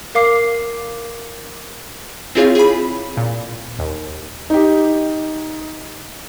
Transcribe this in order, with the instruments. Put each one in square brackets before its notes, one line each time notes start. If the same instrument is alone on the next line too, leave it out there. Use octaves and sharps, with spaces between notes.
[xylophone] A#4 F5 D6 C7
[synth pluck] C4 E4 F4 G#4 C#5 F5
G#4 B5
A#2
D#2
[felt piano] D#4 G4